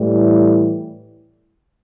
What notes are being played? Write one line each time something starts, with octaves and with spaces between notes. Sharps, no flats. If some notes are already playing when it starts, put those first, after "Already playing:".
Already playing: A2 E3 G3